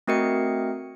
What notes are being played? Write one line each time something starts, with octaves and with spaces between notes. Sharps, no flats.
A3 C4 F#4 A#4 D#5 C#7